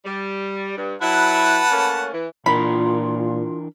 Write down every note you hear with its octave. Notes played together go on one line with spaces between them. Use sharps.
G3
G2
F#3 E4 B4 F#5 A5
A3 A#3 C#4
E3
A#2 E3 D4 F4 A#4 B5